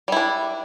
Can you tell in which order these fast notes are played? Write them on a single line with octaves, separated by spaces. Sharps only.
G3 E4 D4